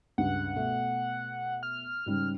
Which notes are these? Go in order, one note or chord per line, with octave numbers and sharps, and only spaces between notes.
C#2 G2 F#5
B2 A3
F6
G#2 C#3 G3